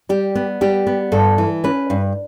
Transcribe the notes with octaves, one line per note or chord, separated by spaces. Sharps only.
G3 G4
B3
G3 G4
B3
G2 A4
E3
C#4 B4
G2